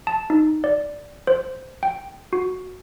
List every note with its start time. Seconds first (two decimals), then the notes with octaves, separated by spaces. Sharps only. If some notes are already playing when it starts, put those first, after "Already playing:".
0.07 A5
0.30 D#4
0.64 D5
1.27 C5
1.83 G5
2.33 F#4